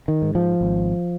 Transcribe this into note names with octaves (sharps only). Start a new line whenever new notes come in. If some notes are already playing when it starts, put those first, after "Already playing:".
D#3
G#2
F3
G#1